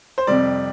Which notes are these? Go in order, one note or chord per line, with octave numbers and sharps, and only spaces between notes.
C5
F2 C3 G3 D5